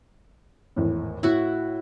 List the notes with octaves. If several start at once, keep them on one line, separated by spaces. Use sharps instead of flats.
G#1 E2 A2
A2 E4 F#4